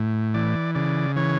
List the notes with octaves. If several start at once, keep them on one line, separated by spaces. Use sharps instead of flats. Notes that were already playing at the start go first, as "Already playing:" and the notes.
Already playing: A2
E3 D5
C#3 D5
E3 C#5